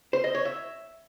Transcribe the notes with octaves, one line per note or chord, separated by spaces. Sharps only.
C5
D#5
C#5
E5